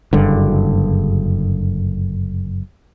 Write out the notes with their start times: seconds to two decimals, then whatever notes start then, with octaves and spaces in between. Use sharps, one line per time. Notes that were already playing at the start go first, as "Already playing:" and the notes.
0.13 F#1 G2 D3